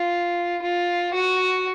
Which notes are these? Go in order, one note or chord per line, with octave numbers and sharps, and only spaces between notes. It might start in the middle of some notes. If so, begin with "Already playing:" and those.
Already playing: F4
F4
F#4